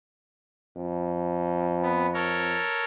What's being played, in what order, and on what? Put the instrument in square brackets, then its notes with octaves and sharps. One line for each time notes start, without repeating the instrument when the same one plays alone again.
[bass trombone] F2
[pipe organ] B3
A4 A#4 C#5